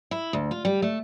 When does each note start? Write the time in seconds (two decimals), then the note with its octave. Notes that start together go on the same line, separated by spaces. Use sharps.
0.11 E4
0.33 D2
0.51 F4
0.65 G3
0.82 A3